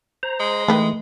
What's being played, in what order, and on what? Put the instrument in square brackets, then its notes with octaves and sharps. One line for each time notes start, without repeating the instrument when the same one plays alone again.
[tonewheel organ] C5 A#5
[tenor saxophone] G#3
[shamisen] D#3 B4 G5 [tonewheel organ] E3 [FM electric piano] A3